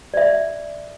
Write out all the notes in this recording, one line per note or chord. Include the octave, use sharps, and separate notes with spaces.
D5 E5